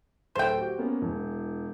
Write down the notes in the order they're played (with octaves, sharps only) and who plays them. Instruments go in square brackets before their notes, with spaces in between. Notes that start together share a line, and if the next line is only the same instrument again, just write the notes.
[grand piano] D1 A4 [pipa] C5 G5
[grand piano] F#4 G4
A#3 B3 C#4
E1 E3